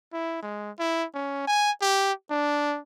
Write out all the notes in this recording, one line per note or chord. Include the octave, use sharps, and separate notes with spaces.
E4
G#3
E4
C#4
G#5
G4
D4